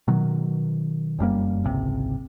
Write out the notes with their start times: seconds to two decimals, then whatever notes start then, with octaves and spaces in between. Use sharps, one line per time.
0.08 B2 D#3 F#3
1.19 F1 F#2 G3 A#3
1.64 G#1 C#2 C3